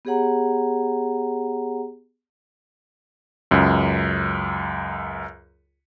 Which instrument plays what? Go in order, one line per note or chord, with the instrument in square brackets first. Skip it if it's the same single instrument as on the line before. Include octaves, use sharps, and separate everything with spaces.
[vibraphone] B3 G4 G#4 C#5 F#5 A#5
[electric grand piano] C#2 F#2